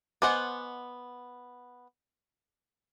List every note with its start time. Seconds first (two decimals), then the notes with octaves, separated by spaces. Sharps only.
0.22 B3 C5 D#5 F#5 G#5 D6